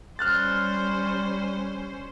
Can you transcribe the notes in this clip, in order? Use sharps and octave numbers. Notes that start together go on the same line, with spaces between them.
G3 C#4 C5 F6 F#6 A6